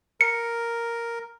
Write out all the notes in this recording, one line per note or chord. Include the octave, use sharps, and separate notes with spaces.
A#4 C#7